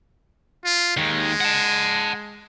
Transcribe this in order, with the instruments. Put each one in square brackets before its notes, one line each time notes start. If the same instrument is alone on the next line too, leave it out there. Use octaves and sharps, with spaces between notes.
[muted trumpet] F4
[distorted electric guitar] D#2 D#3 [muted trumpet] G#3
[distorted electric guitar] F#5 A5